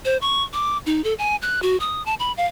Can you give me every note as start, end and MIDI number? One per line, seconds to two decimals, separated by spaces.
0.05 0.17 72
0.21 0.43 85
0.54 0.78 86
0.86 1.03 63
1.04 1.14 69
1.19 1.36 80
1.42 1.62 90
1.63 1.78 66
1.80 2.04 87
2.06 2.14 81
2.19 2.32 83
2.37 2.46 77